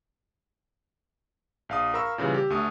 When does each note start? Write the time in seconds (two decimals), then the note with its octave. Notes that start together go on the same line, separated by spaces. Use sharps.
1.69 A#1 F5 D#6
1.94 A#4 F5 A#5 B5 C#6 E6
2.18 A#2 C#3 E3 G3
2.34 G4
2.50 D2 A3 D#6